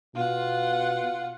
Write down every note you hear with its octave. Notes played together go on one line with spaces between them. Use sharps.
B2 F4 F#5